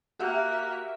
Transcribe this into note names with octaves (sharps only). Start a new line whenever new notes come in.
A#3 F#4 G4 E5 F#6